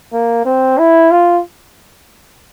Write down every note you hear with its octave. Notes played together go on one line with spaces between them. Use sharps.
A#3
C4
E4
F4